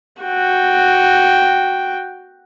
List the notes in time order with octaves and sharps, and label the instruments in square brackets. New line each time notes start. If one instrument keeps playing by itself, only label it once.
[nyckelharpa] F#4 G5